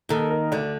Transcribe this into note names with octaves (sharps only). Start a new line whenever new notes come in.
D#2 D#3 A4
A#4
D2 D3 D5